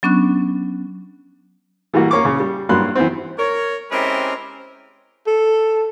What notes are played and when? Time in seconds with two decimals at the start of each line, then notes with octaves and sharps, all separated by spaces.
0.03 F#3 B3 C#4 D4 C#6 F#6
1.94 E3 G3 A#3 F#4
2.11 A#3 C#4 C#6 D6
2.25 C#3
2.40 G3
2.69 G2 F#3 A#3 B5 C6 F#6
2.95 E3 B3 C4
3.39 A#4 C#5
3.92 G#3 C4 C#4 E4 G4 A#4
5.27 A4